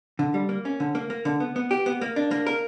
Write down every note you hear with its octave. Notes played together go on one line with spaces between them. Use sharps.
D3
G3
A#3
C#4
D3
A#3
A#3
D3
B3
B3
G4
B3
A#3
D4
A#3
A#4